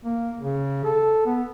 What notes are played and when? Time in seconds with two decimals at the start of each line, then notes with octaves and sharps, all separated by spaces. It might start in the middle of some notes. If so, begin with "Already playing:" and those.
0.05 A#3
0.38 C#3
0.84 A4
1.26 B3